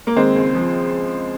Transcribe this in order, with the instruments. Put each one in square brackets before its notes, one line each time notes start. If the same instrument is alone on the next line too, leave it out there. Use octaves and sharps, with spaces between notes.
[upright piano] A#3
D#3 G#3 C4
C#2
F3